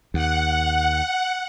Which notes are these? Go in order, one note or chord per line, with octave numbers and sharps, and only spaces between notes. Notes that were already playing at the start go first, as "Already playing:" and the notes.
D#2 F#5